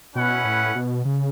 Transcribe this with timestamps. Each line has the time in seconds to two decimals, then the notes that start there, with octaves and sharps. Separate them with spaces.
0.15 B2 C#4 E4 B4 F#5
0.45 A2
0.75 B2
1.05 C#3